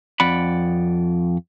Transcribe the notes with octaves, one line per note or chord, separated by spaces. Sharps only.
F2 D5 F#5 B5